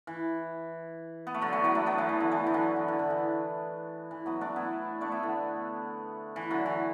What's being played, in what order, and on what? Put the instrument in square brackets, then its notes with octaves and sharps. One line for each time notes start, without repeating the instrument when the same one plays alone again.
[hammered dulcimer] E3
B3
A3
D3 F#3
E3 A3
F#3 B3
A3 D4
F#3 B3
E3 A3
E3
D3 F#3
E3 A3
E3
D3 F#3
E3
D3
D3
E3
E3
F#3 B3
A3 D4
B3 E4
A3 D4
B3 E4
D3
E3
D3 F#3
E3